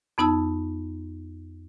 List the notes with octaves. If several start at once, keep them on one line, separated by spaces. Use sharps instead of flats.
F2 B3 D#4 A5 E6